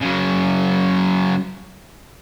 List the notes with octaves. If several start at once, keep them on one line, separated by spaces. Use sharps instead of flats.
C#3 F#3